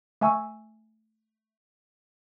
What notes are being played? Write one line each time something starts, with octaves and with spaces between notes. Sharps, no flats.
A3 E5 G#5 C#6 E6